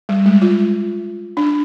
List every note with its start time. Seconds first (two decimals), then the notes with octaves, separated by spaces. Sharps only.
0.09 G3
0.26 G#3
0.42 F4
1.37 D4